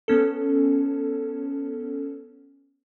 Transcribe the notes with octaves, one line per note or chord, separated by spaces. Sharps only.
B3 C#4 A4